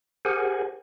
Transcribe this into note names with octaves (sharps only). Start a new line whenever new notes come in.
G4 G#4 A#4 C5 F#5 G#5